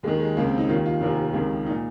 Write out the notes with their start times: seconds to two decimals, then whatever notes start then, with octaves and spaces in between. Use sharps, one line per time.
0.03 D#2 G#3
0.07 D#3
0.20 G#3
0.37 C#2 C#3 A#3
0.47 C4
0.58 D#4
0.69 D#3 F4
0.72 D#2
0.86 F4
1.01 F1 D#2 D#3
1.33 C#2 C3 D#3
1.66 D#4
1.70 A#2